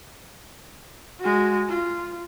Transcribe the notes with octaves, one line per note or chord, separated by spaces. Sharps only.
G#3 F#4
F4